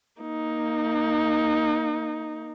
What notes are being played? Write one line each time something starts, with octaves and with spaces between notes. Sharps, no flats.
A#3 D#4